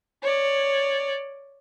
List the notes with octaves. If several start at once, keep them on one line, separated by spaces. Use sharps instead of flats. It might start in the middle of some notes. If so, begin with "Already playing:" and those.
C#5 D5